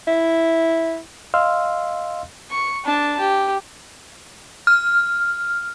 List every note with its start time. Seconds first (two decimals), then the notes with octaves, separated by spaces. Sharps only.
0.07 E4
1.34 D#5 F5 C6 E6 F6
2.51 C#6
2.85 D4 A5
3.20 G4
4.67 F6